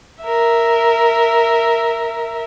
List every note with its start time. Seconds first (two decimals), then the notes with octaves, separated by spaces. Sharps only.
0.23 A#4 E5